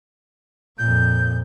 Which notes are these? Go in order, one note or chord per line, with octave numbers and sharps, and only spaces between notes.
F2 A#2 G6